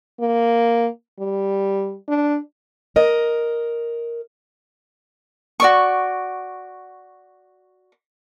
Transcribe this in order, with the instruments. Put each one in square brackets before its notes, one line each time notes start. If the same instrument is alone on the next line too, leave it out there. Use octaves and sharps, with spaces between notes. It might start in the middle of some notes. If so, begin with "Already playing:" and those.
[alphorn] A#3
G3
D4
[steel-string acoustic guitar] A#4 D#5
[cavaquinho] F#4 D5 C#6